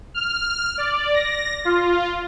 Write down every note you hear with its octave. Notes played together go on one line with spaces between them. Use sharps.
F6
D5
A#6
F4